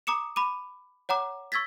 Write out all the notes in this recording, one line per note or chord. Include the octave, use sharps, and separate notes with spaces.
A#5 D6 D#6 C#7 E7
B5 D6 D#7
C#5 F#5 A#5 D6
C#6 E6 G#6 A6 B6